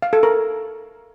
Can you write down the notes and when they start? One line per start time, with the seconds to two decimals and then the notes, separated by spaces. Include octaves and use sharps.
0.02 F5
0.13 A4
0.23 A#4